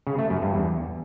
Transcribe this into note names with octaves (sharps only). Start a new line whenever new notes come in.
C#3
A3
F#2
G2
E2